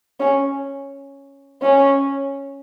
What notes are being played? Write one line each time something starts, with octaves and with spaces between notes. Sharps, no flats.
C#4
C#4